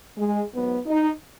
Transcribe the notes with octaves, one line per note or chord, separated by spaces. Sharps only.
G#3
G#2 F#3 B3
D#4